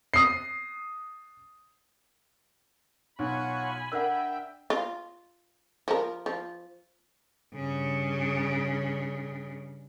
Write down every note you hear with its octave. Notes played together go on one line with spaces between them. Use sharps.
D#6 C7
B1 F4 C#5 F#5 G#5 B5
D4 A#4 D5 E5 F#5 G5 E6
F4
F3 A#4
F3
G2 C#3